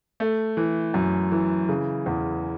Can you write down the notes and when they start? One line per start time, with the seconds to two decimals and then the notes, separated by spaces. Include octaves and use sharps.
0.20 A3
0.57 E3
0.94 F#2
1.32 E3
1.69 C#3
2.06 E2